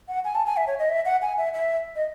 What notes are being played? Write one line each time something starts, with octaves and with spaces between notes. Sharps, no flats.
F#5
G#5
A5
G#5
E5
C#5
D#5
E5
F#5
G#5
E5
E5
D#5